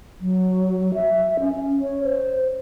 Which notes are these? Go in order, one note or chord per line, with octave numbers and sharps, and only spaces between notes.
F#3
E5
C#4
C#5
C5